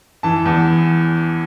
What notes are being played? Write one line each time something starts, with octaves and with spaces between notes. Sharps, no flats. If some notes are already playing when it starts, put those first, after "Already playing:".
E3 A5
E2